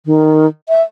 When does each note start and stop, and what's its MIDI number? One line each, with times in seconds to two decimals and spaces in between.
0.06 0.46 51
0.69 0.82 76